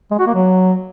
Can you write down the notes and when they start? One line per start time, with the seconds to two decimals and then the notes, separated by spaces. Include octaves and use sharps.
0.11 G#3
0.19 F#4
0.27 A#3
0.34 F#3